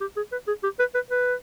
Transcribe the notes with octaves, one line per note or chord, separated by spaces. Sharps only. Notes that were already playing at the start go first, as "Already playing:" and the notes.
G4
G#4
B4
G#4
G4
B4
B4
B4